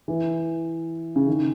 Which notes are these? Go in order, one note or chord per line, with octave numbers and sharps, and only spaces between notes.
E3
C#3
D#3